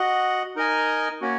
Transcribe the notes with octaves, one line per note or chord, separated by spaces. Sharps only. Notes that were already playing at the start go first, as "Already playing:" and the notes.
Already playing: F#4 D#5 F#5
D#4 A#4 D#5 G#5
A#3 C#4 F#4